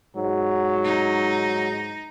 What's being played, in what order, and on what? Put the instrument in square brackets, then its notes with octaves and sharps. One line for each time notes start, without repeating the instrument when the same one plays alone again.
[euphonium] G#2 [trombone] F#3
[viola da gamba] D#4